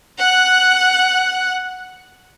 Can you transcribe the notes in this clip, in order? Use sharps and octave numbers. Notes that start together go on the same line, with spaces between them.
F#5 F#6